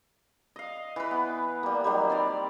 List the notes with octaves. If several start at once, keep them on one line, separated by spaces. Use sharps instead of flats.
D#5 F5
E3 B4
B3
G3 A#3
D#3 F#3 G3
C4 A#4 D5